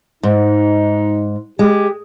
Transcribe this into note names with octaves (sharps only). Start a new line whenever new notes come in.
G#2 D#4
G#3 G4